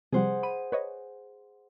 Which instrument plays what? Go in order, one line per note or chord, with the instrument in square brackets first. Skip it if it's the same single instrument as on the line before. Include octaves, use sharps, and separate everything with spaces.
[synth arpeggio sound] C3 F3 G3 [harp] G#4 C5 F#5
[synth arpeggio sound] B5 [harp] D#7
[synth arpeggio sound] B4 C#5 D#5